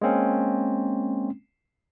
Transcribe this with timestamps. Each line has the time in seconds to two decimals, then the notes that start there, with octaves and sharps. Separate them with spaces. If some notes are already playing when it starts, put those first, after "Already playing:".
0.01 G#3 A#3 C4 C#4